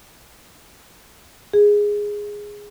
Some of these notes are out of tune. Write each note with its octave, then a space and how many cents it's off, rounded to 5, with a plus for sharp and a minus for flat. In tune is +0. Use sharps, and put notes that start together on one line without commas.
G#4 -5